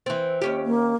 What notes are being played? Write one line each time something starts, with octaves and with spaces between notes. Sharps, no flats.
E3 C4
D#2 C#4 G4
A#3